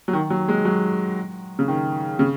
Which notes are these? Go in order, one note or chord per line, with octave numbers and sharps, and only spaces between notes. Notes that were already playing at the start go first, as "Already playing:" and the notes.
F#3
D#3
F#3
G#3
F#3
C#3
D#3
C#3